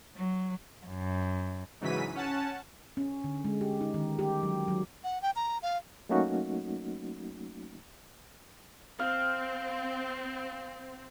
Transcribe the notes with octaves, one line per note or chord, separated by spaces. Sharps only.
F#3
F#2
G#2 C#3 E3 F#3 B6 D#7
C#4 F#5 A5
C#4
D3
G#3
G4
D#4
D#3
G4
F#3
F#3
F#5
G5
A#5
F5
F#3 A3 A#3 C#4 D#4 F#4
C4 F5